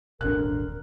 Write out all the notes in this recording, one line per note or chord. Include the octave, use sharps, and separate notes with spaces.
D#1 G#1 D3 A#4 F#6